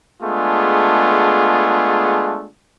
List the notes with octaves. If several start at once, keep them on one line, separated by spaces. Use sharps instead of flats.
G#3 A3 B3 D4 F4 G#4